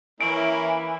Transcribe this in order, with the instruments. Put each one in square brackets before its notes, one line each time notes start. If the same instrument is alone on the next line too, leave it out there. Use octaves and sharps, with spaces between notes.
[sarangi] E3 [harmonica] A#3 C#4 E4 [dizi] G#5 [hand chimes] D7